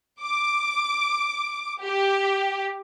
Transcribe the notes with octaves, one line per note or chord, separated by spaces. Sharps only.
D6
G4